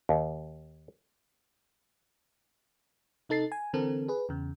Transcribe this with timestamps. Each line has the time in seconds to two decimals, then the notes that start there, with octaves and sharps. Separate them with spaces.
0.09 D#2
3.29 C3 D#4 A4 A6 C7
3.52 G#5
3.73 D3 E3 C4 A4 A#4
4.08 G#4 B4
4.29 E2 C#3